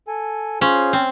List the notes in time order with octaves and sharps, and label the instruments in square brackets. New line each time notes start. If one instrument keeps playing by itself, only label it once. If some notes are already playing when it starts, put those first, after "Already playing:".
[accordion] A4 G#5
[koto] C#4 [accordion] F4 G#4 C5
[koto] C4